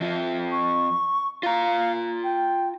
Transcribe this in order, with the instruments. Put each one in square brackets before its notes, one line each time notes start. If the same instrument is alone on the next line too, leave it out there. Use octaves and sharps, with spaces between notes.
[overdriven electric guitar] F2 F3 [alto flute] E5
[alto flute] C#6
[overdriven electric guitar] F4 A#5 [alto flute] F5
[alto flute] G5